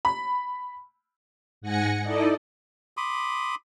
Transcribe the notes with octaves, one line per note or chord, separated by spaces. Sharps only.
B5
G#2 F#5 G#5 A#6 C#7
D#4 E4 A4 D5 D#5
B5 C6 D6 D#6